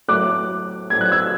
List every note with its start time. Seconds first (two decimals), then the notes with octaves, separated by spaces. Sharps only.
0.08 A2 F#3 A3 D6 F#6
0.90 A2 F#3 A3 G#6
1.01 F#6
1.11 E6 G#6